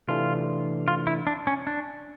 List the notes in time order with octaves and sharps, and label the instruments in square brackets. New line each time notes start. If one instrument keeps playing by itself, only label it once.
[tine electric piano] C3 E3 A3 D4 [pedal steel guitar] F4
[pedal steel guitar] F4
E4
D4
C#4
D4